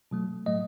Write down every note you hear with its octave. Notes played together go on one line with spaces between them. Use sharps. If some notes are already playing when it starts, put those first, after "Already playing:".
B2 F#3 A3
A2 F#3 A3 D#5